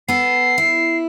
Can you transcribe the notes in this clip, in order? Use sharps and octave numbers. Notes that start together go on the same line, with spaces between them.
B3 A4 C7
E4